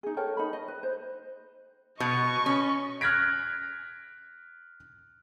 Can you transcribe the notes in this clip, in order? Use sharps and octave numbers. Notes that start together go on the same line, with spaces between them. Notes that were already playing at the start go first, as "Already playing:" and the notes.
D#4 G#4
A4 A#4 C#5 G5
D#4 B5
D#5
B4
C5
B2 D#5 C#6
C#4
F6 F#6 G#6 A#6 B6 D7